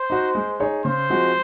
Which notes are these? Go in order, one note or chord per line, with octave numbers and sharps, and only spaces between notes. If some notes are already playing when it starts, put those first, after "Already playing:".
Already playing: C5
D#4 F#4
G#3
D#4 G#4 C#5
C#3 C5
F3 G#3 C4 F#4